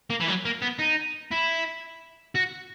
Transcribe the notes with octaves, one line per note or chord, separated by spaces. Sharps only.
A#3
E3
F#3
A#3
B3
D#4
E4
F#4